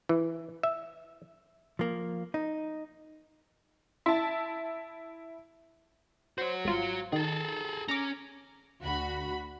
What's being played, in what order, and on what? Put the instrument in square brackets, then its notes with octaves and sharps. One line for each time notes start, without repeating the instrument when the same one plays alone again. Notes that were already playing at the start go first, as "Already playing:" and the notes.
[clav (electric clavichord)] E3
E5
[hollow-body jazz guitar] F3 A#3
D#4
[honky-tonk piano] E4 A5
[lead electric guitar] F#4 C#5 [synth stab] C5
[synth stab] G#1 F4
[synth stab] D#3 [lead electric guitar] G#4 A4
[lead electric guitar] C#4 [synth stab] A#5 D6
[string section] D2 F#4 B5